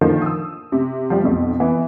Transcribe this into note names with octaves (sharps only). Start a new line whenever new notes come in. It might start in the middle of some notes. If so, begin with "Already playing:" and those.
A#2 D3 D#3 F3
D#6 E6
C3
F3 G3 G4
B1 F2 B2
E3 B3